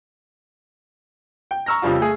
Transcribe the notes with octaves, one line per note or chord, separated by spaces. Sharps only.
G5
A#5 C#6 E6 F6 A#6
F2 C#3 F3 G3 F4
A3 G#4